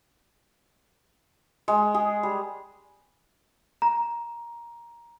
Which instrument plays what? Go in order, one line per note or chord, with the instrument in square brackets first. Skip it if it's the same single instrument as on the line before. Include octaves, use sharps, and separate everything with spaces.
[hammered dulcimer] G#3
G#4
G3
[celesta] A#5